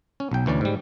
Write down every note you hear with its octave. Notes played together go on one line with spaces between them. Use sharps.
C#4
B1 G5
D2 E3 C#4 D5
G#2 G3